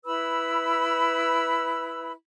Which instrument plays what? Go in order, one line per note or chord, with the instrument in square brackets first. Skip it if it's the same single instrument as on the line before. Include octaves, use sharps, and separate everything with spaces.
[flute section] E4 B4 B5 E6